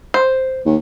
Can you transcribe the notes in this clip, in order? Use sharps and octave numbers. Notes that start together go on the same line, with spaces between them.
C5
D#2